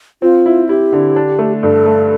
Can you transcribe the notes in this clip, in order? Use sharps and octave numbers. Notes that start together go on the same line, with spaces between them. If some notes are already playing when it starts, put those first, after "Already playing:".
C4 F4
E4
E4 G4
D3
D4
A3
G2 A4
A3